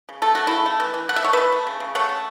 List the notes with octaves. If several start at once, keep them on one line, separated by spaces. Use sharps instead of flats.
C#3
A3 A4
A3 F#4
C#3 E4 A4
A3
E3
E3
A3 F#5
E5
A3 C#5
E3 B4 E5
A3
C#3
C#3
A3 C#5 F#5
A3